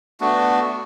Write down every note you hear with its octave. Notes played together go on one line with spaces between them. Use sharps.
A3 B3 D4 F#4